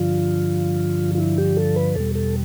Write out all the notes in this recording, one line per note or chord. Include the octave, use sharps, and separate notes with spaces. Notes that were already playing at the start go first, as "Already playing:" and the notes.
Already playing: G2 D3 F3 F4
F4
E4
G4
A4
B4
E2 B2 G3 A4
A4